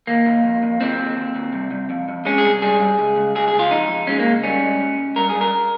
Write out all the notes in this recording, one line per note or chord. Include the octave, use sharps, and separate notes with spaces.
D#2 A#3
D#2
F2
F2
D#2 C4
D#2
D#2
D#2
C2
C2
F2
F2
G#3 C#4
G#4
C2
G3 G#4
G2
C#2
C#2
C#2 G#4
G#4
C#2
F4
F2 D#4
F2
G#3 C#4
A#3
C#2
G3 C#4
G#2
G#2
G#2
G2 A#4
G2 G#4
A#4